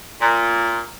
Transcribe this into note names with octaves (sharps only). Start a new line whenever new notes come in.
A#2